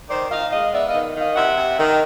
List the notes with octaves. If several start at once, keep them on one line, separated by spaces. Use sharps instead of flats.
D#3 C5 D5
D#3 D#5 F5
G#3 D#5 F5
B3 D5 E5
D#5 F5
D#3
D#3
D#5 F5
C3 E5 F#5
C3
D#3